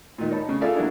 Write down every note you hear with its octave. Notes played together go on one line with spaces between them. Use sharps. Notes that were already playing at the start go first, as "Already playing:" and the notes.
A#2 D#3
D#4 C#5 A5 B5
C#3
F4 G#4 A4 D5 E5 F5
F#3 A#3 D4 E4